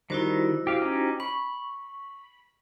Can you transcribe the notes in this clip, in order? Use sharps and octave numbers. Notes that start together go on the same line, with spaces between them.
D#3 G3 E4 F#4 C5
G4 F5
C#4 D#4 G4
B5 C#6